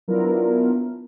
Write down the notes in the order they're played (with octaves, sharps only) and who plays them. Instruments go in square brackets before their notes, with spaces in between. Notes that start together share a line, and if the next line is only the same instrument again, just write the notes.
[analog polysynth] F#3 B3 D4 E4 F4 A#4